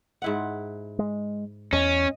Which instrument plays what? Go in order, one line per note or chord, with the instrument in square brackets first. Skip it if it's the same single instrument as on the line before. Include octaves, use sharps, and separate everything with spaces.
[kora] G#2 E4 F#5
[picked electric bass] G#3
[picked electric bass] E2 [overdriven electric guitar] C#4 [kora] D#5